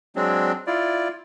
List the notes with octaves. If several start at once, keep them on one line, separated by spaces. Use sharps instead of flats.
F#3 G#3 C4 D4
E4 F4 D5